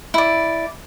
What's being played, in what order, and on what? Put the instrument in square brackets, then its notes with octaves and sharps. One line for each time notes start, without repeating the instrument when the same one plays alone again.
[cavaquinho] E4 D5